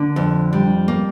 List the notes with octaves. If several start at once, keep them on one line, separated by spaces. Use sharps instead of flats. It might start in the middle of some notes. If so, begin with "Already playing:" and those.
Already playing: D3 A#3
F2
G3
A#3